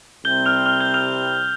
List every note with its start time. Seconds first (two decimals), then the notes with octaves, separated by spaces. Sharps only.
0.25 C2 C3 G3 C4 G6 G7
0.46 F6 F7
0.66 F6 F7
0.81 G6 G7
0.94 F6 F7